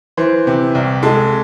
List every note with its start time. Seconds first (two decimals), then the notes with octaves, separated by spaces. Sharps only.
0.17 E3 C5
0.47 C3
0.75 C2
1.03 G#3 A4